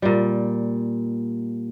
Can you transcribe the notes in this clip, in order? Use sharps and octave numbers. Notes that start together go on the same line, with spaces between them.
A#2 G3